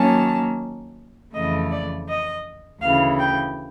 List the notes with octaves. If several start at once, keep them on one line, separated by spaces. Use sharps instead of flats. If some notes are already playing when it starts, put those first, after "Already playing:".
Already playing: D#3 F#3 A#3 C#4 A5
F2 C#3 E3 A3 D#5
D5
D#5
D2 C#3 E3 F5
G5